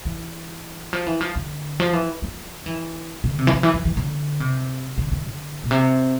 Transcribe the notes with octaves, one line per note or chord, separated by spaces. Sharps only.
E3
F3
E3
F3
D3
F3
E3
F3
E3
D3
C3
E3
D3
E3
F3
E3
D3
C3
D3
D3
D3
A#2
C3